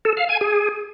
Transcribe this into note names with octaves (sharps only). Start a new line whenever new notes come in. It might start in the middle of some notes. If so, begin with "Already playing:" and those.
A4
F5
G#5
G#4